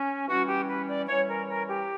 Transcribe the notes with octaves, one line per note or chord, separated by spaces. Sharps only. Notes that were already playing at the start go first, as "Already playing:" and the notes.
Already playing: C#4
E3 G3 C#4 F#4
G4
B4
D5
E3 G3 C#4 C#5
A#4
A#4
G4